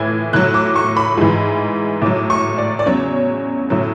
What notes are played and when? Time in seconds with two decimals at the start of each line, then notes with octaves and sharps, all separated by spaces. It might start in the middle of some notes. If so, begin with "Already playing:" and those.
Already playing: A2 E3 G#6
0.33 A2 F#3 F#6
0.54 D6
0.76 C#6
0.97 B5
1.17 G#2 E3
2.02 A2 F#3 D6
2.30 C#6
2.58 D5
2.79 D5
2.86 E2 C#3 F#3 C#5
3.70 A2 F#3